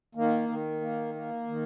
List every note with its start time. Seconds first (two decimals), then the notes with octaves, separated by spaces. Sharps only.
0.15 D#3 A#3
0.49 D#3
0.81 A#3
1.15 A#3
1.47 D#3